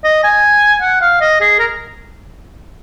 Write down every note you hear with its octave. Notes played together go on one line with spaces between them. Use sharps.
D#5
G#5
F#5
F5
D#5
G#4
A#4